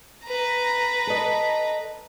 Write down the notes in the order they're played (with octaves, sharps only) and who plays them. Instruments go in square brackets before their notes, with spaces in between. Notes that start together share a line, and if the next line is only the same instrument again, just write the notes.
[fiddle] B4 A#5
[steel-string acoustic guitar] A4 D#5